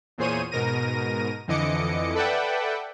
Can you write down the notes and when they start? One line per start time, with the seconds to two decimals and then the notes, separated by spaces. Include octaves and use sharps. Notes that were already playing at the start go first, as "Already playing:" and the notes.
0.18 E2 A#2 G#4 C5 C#5 D#7
0.51 G#2 B2 A#4 A#6 D#7
1.48 F2 D3 E3 D#5 D6 C#7
2.15 A4 B4 D5 E5 F#5 G5